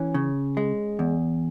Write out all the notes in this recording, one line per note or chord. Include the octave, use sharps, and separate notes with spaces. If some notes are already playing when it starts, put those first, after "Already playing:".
Already playing: E3 C#4
C#3
G#3
E2